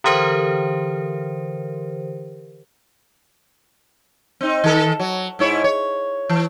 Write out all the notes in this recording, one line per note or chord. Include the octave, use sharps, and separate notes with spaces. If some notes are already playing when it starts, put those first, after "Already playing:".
D3 E3 G4 A#4 C5
C4 D#4
D#3 A4
F#3
G#2 E4 C#5
C#5
E3